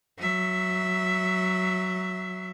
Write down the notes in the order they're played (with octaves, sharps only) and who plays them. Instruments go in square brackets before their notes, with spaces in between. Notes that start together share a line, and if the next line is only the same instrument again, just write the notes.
[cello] F#3 E5